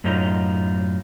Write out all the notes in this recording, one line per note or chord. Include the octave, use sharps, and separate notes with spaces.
F#2 A2 F#3 D#4 F4